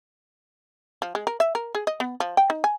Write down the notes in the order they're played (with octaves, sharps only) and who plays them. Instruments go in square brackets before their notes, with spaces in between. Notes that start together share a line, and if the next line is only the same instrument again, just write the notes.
[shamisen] F3
G#3
A#4
E5
A#4
G#4
D#5
B3
F3
G5
D#4
G#5